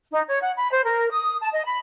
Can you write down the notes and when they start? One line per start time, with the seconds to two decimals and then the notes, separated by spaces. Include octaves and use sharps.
0.11 D#4
0.27 C#5
0.41 F#5
0.57 B5
0.71 C5
0.85 A#4
1.11 D#6
1.41 A5
1.53 D#5
1.65 B5